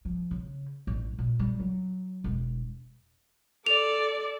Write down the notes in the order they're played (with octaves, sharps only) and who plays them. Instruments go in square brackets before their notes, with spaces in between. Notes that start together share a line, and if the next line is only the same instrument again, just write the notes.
[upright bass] F3
C#3
A1
A#2
G3
F#3
E1
[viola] A4 D5 [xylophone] F7